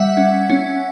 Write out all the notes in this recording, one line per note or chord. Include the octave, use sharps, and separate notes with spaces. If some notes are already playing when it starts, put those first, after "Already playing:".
Already playing: G3 E5 F#5
C#4
C#4